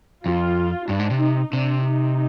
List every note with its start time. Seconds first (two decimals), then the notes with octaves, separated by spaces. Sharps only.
0.25 F2 F4
0.89 G2 D4
0.99 G#2
1.11 C3
1.20 D#4
1.53 C3 D4
1.85 D#4